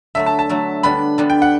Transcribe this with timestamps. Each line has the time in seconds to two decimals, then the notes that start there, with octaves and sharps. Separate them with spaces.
0.15 D3 F#3 A3 E5
0.26 A5
0.39 A5
0.49 D3 F#3 A3
0.83 D3 G3 B3 D4 B5
1.18 D3 G3 B3 D4
1.30 G5
1.42 F#5